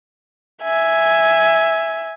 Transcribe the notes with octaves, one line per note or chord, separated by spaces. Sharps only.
E5 G#5